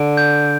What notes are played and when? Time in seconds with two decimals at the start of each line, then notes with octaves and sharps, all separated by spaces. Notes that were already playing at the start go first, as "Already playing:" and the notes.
Already playing: D3 D7
0.17 G6